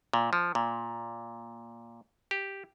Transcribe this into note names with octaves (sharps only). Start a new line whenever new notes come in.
A#2
F3
A#2
G4